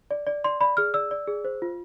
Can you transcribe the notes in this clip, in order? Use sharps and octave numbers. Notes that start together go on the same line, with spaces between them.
D5
D5
D5 C6
D5 B5
G#4 F6
D5 E6
D5
G#4
C5
F4